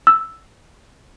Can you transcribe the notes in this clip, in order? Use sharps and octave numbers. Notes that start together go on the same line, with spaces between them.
E6